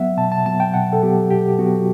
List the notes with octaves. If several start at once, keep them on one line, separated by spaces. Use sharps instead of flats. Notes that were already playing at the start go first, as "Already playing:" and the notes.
Already playing: F#3 B3 E5 F#5
B2 A5
A5
F#3 B3 A5
G5
B2 F#5
A4
F#3 B3 G4
B2 G4
F#3 B3 F#4